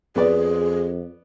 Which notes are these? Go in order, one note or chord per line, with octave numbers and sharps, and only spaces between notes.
F2 B3 G#4 D5